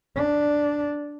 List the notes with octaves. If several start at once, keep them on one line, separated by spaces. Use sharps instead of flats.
D4